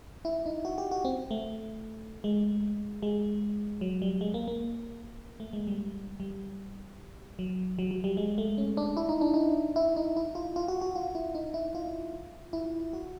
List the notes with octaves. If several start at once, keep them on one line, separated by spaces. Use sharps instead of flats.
E4
D#4
F#4
G4
F#4
C4
A3
G#3
G#3
F#3
G3
G#3
A#3
A#3
A3
G#3
G3
G3
F#3
F#3
F#3
G3
G#3
A3
C#4
D4
E4
D#4
D4
D#4
E4
D#4
E4
F4
F4
F#4
F#4
F4
E4
D#4
E4
F4
E4
F#4